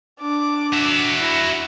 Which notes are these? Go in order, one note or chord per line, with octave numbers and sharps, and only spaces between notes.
D4 D6
F#4 E5
E4